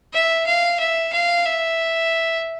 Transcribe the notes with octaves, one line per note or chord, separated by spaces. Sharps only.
E5
F5
E5
F5
E5